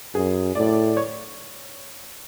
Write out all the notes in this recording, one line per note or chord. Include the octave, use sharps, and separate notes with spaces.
F#2 G#4
A2 D5
C#5